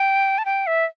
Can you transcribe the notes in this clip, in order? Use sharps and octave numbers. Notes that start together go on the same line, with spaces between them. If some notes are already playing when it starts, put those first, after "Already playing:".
Already playing: G5
A5
G5
E5